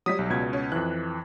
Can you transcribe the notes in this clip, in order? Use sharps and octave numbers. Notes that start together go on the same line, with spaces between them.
F#3 G3 D#6 B6
B1
C#2 B2 G#6
C#4
F2 E3 F#6